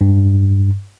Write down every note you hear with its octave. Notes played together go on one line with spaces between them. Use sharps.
G2